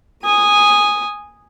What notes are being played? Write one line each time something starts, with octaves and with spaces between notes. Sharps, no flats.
G#5 D#6